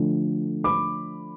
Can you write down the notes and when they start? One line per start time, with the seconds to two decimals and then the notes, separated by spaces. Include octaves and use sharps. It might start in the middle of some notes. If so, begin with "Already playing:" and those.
Already playing: D3 F3 A3
0.64 B5 D6